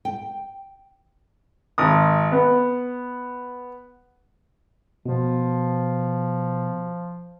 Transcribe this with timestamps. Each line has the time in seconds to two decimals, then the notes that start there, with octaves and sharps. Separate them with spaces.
0.05 G5
1.78 G#1 D#6
2.32 B3
5.06 B2 F3